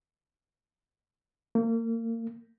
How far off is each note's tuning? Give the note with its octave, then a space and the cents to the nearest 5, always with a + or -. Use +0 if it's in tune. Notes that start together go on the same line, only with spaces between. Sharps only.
A#3 -30